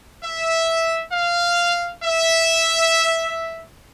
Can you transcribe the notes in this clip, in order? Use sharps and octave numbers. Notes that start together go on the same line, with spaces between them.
E5
F5
E5